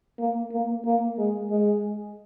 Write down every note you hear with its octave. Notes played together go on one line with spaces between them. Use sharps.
A#3
A#3
A#3
G#3
G#3